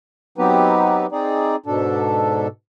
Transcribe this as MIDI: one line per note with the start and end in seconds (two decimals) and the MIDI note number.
0.38 1.06 54
0.38 1.06 59
0.38 1.06 60
0.38 1.06 63
0.38 1.06 67
0.38 1.06 71
1.12 1.56 60
1.12 1.56 63
1.12 1.56 68
1.12 1.56 74
1.66 2.48 44
1.66 2.48 47
1.66 2.48 62
1.66 2.48 69